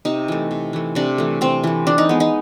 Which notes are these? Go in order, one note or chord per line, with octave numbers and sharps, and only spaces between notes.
C3 D#4
E3 A3
C3
E3 A3
C3 D4
E3 A3
C3 C4
E3 A3
E3 D4
D#4
G#3 B3
D#4